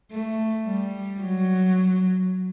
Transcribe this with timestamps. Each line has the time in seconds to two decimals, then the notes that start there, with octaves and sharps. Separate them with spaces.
0.12 A3
0.66 G3
1.21 F#3